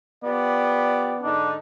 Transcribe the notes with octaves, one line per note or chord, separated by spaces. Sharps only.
F3 B3 G4 D5
G#2 D3 D4 D#4